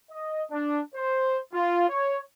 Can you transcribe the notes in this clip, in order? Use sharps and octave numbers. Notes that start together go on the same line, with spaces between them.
D#5
D4
C5
F4
C#5